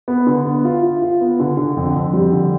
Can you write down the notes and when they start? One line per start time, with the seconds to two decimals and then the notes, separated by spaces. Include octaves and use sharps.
0.08 B3
0.27 D3
0.45 B3
0.65 F4
0.83 F4
1.02 F4
1.21 B3
1.40 D3
1.57 D3
1.77 F2
1.95 F2
2.13 G3
2.32 D3